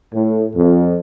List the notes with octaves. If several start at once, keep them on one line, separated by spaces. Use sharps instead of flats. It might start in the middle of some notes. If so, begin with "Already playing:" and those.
A2
F2